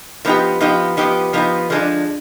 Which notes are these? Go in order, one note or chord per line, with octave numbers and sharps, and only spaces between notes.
F3 B3 D#4 G4
F3 B3 D#4 G4
F3 B3 D#4 G4
F3 B3 D#4 G4
D3 F3 G#3 D4